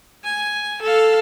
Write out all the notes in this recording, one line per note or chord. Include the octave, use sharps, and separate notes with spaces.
G#5
A4 F5